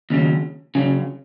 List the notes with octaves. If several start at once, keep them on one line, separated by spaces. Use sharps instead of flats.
D#2 C#3 F#3
C#3 F#3